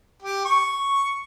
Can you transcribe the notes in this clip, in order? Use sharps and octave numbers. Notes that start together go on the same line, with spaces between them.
G4
C#6